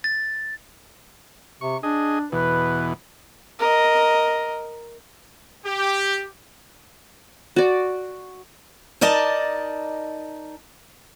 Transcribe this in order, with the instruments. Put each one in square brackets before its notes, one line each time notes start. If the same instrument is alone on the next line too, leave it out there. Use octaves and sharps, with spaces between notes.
[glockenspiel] A6
[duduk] C3 [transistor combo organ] C#6
[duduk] D4 [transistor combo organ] G#4 D#5
[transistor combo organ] E2 B2 [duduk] B4
[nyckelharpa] A#4 D#5
[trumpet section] G4
[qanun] F#4 D5
[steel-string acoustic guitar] D#4 A#4 D5 D#5 A5